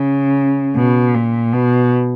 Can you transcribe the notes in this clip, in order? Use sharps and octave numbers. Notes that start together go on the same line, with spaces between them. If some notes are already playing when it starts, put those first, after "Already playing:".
Already playing: C#3
B2
A#2
B2